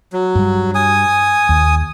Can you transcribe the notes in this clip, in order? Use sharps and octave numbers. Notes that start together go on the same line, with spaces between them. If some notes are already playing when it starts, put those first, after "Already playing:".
F#3
G2 G3
G#5 D#6
D#2